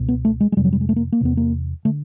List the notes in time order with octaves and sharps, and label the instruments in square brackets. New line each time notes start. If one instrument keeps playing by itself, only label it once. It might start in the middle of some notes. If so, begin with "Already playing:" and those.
Already playing: [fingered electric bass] C#2 B2
B3
A3
G#3
G#3
F2 C3 G3
F#3
G3
G#3
A3
A#3
A#3
E2 C3 B3
A#3
D3 A3